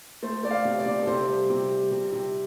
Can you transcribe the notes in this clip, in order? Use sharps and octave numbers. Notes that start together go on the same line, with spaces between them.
A3 C5
A3 D5
F5
C3
D5
C3
A4
C3 C5
G3
C3
G3
C3
C3